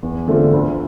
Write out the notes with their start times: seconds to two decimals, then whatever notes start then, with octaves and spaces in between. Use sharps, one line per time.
0.03 E2
0.28 D3 A3 C4 F4
0.53 D2